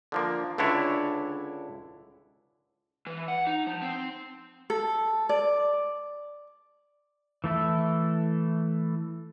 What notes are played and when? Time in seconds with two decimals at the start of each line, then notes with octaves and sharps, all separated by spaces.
0.12 D3 F3 A#3
0.58 C#2 D3 D4 E4 C#5
3.07 E3
3.28 F#5
3.47 D#4
3.67 F3
3.82 C4
4.70 A4
5.29 D5
7.44 E3 A3 E4 A4